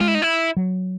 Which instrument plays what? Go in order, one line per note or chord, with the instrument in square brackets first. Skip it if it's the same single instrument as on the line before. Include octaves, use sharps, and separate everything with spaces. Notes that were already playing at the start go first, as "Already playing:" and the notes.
[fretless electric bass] G#3 [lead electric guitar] F4
[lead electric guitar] E4
D#4
E4
[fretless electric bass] F#3